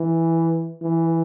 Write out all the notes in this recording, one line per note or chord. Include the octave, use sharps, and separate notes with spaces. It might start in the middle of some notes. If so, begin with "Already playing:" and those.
Already playing: E3
E3